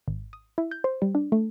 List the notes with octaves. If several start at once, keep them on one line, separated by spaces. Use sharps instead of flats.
G#1
D#6
E4
G6
C5
G3
D4
A3